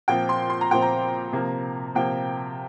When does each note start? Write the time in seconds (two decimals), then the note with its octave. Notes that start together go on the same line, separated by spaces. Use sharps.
0.08 A#2 F3 C4 G5
0.29 C6
0.50 C6
0.61 A#5
0.71 A#2 F3 C4 G5
0.82 A#5
1.33 C3 F3 A#3
1.95 C3 F3 A#3 G5